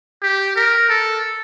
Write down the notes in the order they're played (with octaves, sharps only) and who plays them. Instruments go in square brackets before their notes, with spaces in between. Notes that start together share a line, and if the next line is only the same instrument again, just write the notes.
[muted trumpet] G4
A#4
A4